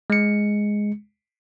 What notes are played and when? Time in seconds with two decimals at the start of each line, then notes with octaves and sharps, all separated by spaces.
0.10 G#3 C#7